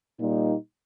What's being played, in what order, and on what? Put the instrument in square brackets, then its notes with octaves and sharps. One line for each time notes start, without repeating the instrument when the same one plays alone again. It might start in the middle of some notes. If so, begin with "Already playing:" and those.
[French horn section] A#2 G3 A#3 D#4